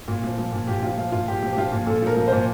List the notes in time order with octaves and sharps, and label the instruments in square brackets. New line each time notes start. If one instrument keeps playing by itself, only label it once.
[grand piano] A#2
F3
F3
A#2
A#2 G4
F3 F4
F3 F4
A#2 F4
A#2 G4
F3
G4
F3 F4
A#2
A#2 A4
F3 A#4
F3
A#2 C5